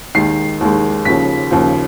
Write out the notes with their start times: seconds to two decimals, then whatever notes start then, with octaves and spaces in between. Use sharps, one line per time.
0.15 D#2 D#3 G#3 C7
0.60 D#2 D#3 G#3
1.05 D#2 C#3 F3 B6
1.51 D#2 C#3 F3